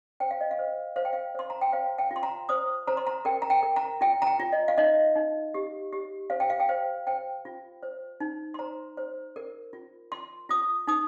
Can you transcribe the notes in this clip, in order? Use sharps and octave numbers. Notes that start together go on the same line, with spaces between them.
C5 G5
F5
D#5
F5
C5
C5 F5
G5
F5
C5 C6
A#5
G5
C5 F5
G5
F4
C6
A#5
C5 D#6
C5 A#5
C6
A#5
A#4 G5
A#5
G5
A#4
A#5
F4 G5
A#5
G5
F4
D#5
F5
D#4 D#5
D#4
G4
G4
C5 F5
G5
F5
G5
C5 F5
C5 G5
F4
C5
D#4
C6
C5 A#5
C5
A#4
F4
F4 C6
F4 D#6
D#4 D#6